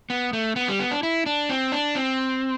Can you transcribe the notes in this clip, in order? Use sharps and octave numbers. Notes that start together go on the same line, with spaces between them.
B3
A3
B3
G3
B3
D4
E4
D4
C4
D4
C4